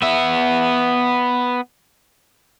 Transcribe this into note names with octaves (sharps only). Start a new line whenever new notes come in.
B3 E5